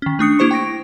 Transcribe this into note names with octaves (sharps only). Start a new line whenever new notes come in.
D#3 C#4
A3 D4 D#6 C#7
A#3 E4 G4 C5 C#6 C#7
G5 C#6 A#6 D7